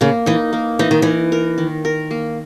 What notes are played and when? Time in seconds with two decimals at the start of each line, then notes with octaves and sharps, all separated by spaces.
0.01 C#3 A#3
0.26 E3 D#4
0.53 A#3
0.79 E3 D#4
0.91 D#3
1.02 E3 A#4
1.32 A#4
1.58 D#3
1.85 A#4
2.11 A#3